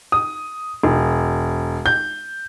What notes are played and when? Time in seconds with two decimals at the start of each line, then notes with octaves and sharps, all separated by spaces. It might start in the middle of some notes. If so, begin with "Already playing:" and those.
0.12 D#6
0.83 E1
1.86 G6